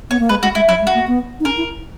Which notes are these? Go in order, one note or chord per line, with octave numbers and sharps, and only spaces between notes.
B3 C#5
A#3
G#3 B4
G#3 F#4
G#3 E4
F#3 E4
G#3
F#4
A#3
B3
D#4
C#4 A#4
E4